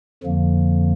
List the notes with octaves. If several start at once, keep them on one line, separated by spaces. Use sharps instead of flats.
F2 D3 F3 A#3